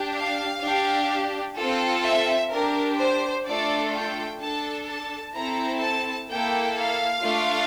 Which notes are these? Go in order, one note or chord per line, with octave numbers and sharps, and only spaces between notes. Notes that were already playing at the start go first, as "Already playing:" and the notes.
Already playing: D4 G4
F5
D4 G4
C4 F4 A4
E5
D4 G4 A#4
C5
A3 D4 F4 A4 D5
G5
D4 A4 A5
A5
C4 E4 A4 A#5
A5
A#3 E4 A4 G5
F5
A3 D4 F4